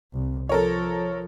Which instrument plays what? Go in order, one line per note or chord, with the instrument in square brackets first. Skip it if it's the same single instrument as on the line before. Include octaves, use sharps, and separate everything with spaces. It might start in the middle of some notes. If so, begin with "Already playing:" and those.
[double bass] C2
[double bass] F3 [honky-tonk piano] A4 A#4 C#5